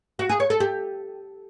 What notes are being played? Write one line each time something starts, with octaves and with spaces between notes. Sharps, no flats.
F#4
G#4
C#5
A4
G4